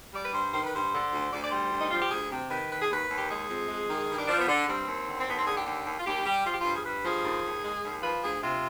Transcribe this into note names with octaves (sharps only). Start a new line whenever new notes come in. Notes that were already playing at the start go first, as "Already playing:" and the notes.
G3 D5
B4
G2 C5
D#3 C5
B4
G2 C5
D3
D2
D2 D5
D5
G3 C5
D2
D#4
F3 F4
G4
D2 G#4
C3 G4
D#3 B4
D#2 B4
G#4
D#2 B4
D#2
G4
G#3 G#4
F2
G#3
D#3
G2
D4
F3 D4
B3
D3
G2 C4
D#2
D3
C4
D#2 B3
C4
D3 G#4
G4
D#2 G4
D#2
F4
D#2 G4
G3 G4
F3 F4
G4
F4
G2
G#4
G2 B4
F3 G#4
D#2
D#2
G#3
D#2
F3 B4
D2 G#4
C3 F4